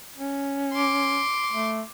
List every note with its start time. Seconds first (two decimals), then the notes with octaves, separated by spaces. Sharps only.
0.17 C#4
0.72 C6 D6
1.52 A3